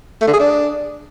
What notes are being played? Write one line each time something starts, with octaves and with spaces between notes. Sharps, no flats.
A3
D3
G#4
D4